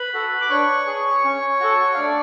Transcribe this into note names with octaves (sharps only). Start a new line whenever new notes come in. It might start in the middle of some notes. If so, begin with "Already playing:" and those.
Already playing: B4 B5
F#4 A4
D6
D4 C#5 C#6
G#4
C#4
F#4 A4
F5
A3 D4 D5